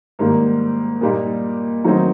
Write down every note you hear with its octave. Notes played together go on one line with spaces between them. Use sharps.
G#2 D#3 G3 A#3
A#2 G3 A#3 D#4
D#3 F#3 A3 C4 D#4